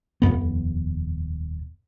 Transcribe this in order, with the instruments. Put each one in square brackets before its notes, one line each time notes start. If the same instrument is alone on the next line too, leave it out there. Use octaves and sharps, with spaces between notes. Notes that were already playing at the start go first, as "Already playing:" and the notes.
[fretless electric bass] D#1 G#1 F2 B3